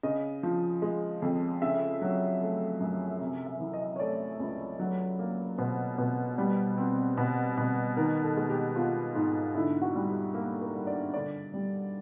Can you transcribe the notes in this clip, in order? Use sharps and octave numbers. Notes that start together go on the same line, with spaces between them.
C#3 D#5
F3
G#3
F2
C#3 E5
F#3
A3
F#2
C3
E5
E3
D#5
C#5
A3 D5
C#2
F#3
A#3
B2 C5
B2
G3
C4
B2
B2
D#3 A#4
A4
G#3
G4
B3 F4
G#2
D3 E4
F#4
G3
G4
A#3
A#4
G2
D5
D3 D5
G3